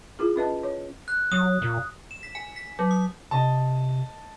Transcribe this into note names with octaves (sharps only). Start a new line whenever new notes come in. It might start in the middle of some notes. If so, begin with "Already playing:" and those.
E4 F4 G#4
C#4 B4 D#5 A5
C#5
F#6
F#3 D#6
A#2
E7
B6
G#5
B6
F#3
D#6
C3 D#5 A5